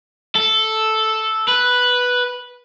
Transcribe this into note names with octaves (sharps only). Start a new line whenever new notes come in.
A4
B4